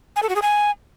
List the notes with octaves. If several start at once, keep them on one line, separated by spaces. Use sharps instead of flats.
G#5
A4
F#4
G#4
G#5